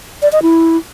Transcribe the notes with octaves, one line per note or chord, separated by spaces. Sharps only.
D5
D#5
E4